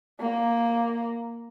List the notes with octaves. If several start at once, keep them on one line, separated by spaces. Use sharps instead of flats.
A#3